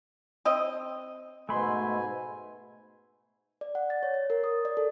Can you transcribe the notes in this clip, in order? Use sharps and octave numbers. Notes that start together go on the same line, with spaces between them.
C4 D#5
G#2 B2 A3 G#5 B5 C6
D5
F#5
A6
C#5
A6
A#4
D#6
D5
A4